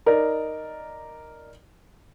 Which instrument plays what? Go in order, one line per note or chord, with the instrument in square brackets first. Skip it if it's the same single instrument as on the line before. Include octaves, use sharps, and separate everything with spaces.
[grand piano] D#4 A#4 D5